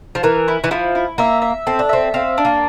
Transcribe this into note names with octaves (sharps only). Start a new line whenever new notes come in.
F3
E3 A#4
E4
E3
F3 E4
E4
A#3 E5
E5
C4 A4
D4
C4 E5
C4 F5
D4
A#3